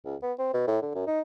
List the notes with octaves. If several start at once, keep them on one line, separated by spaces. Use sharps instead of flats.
C#2
B3
C4
B2
A2
D3
F#2
D#4